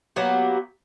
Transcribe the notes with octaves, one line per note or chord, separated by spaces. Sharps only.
F#3 A#3 B3 G4